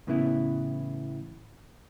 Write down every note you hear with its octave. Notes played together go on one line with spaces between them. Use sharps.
A2 C#3 E3 B3 E4